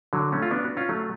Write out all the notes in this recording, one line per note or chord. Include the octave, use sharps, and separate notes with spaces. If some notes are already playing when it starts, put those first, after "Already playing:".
D3 F#3
A3 C#4
F4
B3 D4
F#4
C#4 F4
F#3 A3